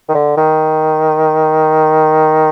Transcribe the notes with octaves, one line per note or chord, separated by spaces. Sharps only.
D#3
D3
D#3